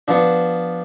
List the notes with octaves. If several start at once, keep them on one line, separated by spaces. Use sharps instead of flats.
F3 B3 D4